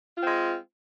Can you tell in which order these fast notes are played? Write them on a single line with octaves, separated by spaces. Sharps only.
F4 C4 G#3